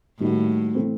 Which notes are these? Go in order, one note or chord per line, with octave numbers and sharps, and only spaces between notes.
A2 D#3 G3 A#3 D#4 F#4
E3 A3 C4